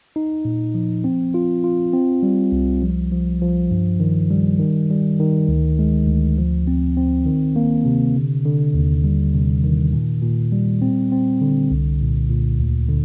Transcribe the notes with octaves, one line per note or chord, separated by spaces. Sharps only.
D#4
A#2
F3
C4
F4
F4
C4
G3
C2
F3
F3
F3
G2
D#3
G3
D#3
G3
D#3
D2
G#3
D2
F3
C4
C4
D#3
A#3
C3
D3
D3
D#2
G3
C3
D#3
A#2
A#2
G3
C4
C4
D3
C2
A#2
A#2
D2
D3